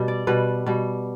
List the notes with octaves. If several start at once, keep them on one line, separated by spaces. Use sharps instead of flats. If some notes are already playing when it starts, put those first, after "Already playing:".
Already playing: B2 G3 G4
D5
B2 G3 B4
B2 G3